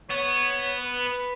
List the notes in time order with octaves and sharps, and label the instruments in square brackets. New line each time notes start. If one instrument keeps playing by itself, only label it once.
[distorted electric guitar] B3 [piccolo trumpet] C#5
[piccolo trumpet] B4